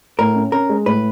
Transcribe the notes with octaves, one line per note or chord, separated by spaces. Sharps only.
A2 A#4
C#4
C#4 A#4
G#3
A2 B4